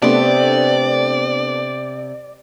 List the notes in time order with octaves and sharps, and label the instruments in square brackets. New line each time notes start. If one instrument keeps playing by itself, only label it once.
[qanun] C3 C6 [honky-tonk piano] A3 B3 D4 [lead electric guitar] D5